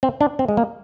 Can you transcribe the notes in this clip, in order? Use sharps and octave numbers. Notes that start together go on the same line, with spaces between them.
C4
D4
C4
G#3
A#3